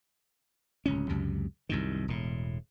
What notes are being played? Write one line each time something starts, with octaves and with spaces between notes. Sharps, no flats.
D1 C#2 C#4
C#2 F#2 C3
C2 F#2 D#3
E1 A2